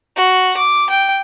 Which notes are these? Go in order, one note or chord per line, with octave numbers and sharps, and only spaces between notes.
F#4
D6
G5